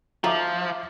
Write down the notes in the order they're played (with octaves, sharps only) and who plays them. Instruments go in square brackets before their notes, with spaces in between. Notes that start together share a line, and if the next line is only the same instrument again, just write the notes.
[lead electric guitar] F3 [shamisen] F#3 A3 D#4 [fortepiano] F4 E5 D6